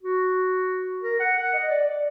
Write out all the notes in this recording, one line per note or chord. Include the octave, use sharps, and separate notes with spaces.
F#4
A#4
F#5
F#5
D#5
D5
D5